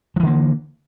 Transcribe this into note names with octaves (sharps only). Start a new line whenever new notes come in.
D3 E3 F3 A#3